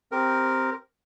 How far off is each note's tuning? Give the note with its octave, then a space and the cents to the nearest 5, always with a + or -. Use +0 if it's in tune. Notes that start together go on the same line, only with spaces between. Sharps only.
C4 +0 G4 -5 A#4 +0